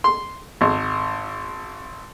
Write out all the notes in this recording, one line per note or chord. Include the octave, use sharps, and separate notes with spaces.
C6
G#1